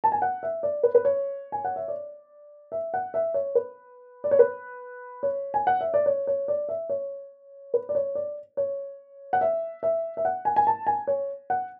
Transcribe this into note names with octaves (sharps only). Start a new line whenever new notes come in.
A5
G#5
F#5
E5
D5
B4
B4
C#5
G#5
F#5
E5
D5
E5
F#5
E5
C#5
B4
D5
C#5
B4
C#5
G#5
F#5
E5
D5
C#5
C#5
D5
E5
C#5
B4
D5
C#5
D5
C#5
F#5
E5
E5
E5
F#5
G#5
G#5
A5
G#5
C#5
F#5